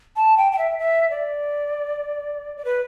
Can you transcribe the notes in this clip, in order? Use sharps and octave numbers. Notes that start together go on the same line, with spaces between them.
A5
G5
G5
E5
E5
D5
D5
B4